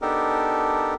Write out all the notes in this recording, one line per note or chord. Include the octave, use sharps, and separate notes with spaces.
B3 D4 D#4 G4 A4 A#4